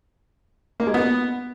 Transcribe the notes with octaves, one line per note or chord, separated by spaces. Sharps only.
A#3
G#3
B3